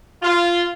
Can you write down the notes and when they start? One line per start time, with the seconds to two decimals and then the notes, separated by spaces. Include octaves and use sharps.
0.23 F4